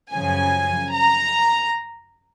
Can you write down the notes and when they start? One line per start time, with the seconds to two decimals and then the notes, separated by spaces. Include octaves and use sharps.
0.12 F#2 C#3 F3 G#5
0.93 A#5